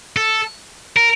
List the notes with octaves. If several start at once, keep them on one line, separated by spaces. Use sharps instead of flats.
A4
A#4